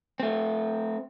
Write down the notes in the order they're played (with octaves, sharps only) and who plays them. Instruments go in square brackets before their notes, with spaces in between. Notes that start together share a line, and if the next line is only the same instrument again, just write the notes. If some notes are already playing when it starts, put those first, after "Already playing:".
[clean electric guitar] A3 C4